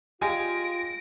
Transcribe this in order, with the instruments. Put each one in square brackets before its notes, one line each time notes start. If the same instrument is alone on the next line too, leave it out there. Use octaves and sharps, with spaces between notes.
[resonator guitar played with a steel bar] G#3 [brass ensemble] F4 [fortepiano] G4 F5 G#5 [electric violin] A#6 D7